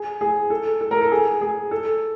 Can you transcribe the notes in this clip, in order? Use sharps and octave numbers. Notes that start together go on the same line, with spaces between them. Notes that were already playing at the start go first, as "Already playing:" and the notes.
Already playing: G#4
G#4
A4
A4
A#4
A4
G#4
G#4
A4